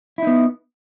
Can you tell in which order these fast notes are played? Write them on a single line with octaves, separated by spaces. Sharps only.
E4 D#4 B3